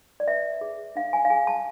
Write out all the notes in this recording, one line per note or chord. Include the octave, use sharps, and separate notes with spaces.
D5
B4 E5
G#4
D4 F5
G#5
F5
G#4 G#5
A5